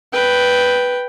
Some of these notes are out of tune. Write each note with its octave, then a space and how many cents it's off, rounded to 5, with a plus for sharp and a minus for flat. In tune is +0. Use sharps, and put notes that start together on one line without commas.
B4 +0 G5 +0